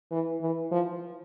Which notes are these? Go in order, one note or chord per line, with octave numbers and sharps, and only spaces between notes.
E3
E3
F3